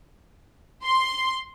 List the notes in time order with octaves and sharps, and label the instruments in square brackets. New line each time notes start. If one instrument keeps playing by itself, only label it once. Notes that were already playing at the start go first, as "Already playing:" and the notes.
[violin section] C6